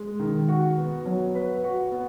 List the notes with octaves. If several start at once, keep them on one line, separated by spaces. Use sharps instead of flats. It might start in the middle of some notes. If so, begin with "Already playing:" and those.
Already playing: G#3
D#3
F#4
B3
F#3
B4
F#4
B3